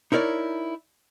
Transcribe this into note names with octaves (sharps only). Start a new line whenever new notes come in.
D#4 E4 A#4 C#5 D5